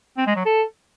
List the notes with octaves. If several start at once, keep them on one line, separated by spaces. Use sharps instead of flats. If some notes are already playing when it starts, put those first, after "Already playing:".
C4
G#3
F#3
A4